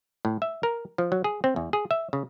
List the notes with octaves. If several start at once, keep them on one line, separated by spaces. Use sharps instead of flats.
A2
E5
A#4
F3
F#3
G#4
C4
E2
G#4
E5
C#3